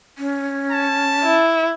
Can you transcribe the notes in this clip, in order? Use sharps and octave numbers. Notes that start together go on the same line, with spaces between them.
C#4
A5
E4